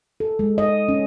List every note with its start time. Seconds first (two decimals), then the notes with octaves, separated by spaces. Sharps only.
0.20 A4
0.39 G#3
0.58 D#5
0.89 C#4